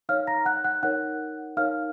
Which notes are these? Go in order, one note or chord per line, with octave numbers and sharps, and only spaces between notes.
D#4 A#4 C#5 F5 F6
A#5 A#6
F#5 F#6
F#5 F#6
D#4 A#4 C#5 F#5 F#6
D#4 A#4 C#5 F5 F6